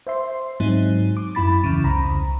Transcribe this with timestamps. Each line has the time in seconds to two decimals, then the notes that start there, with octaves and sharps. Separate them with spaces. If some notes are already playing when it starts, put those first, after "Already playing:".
0.07 C5 E5 C6
0.60 G#2 F#3 C4 D#4
1.17 D6
1.35 F#2 E4 B5 A6
1.64 E2 C#3
1.84 C2 A#5 B5